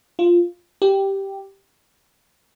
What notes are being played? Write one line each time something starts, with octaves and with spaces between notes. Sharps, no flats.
F4
G4